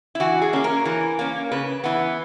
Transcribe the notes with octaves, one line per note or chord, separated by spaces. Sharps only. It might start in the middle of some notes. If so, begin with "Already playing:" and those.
E4
E3 F#4
G#4
A#3 C#4 G#4
A#4
E3
A#3 C#4
C#3 B4
E3 B3